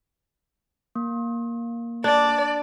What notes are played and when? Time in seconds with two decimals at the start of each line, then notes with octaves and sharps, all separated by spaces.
0.95 A#3
2.04 D4 D5